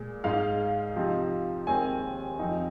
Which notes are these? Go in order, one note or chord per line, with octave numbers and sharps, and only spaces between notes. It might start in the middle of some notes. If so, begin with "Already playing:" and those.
Already playing: A#2 G#3
G#2 G#3 D#4 F5
C3 F3 C4 D#4
D#2 D#3 G#3 C4 G#5
F2 F3 C4 D#4